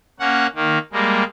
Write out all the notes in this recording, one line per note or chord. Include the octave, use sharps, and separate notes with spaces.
A#3 C#4 F#5
D#3 A#3
G3 G#3 A#3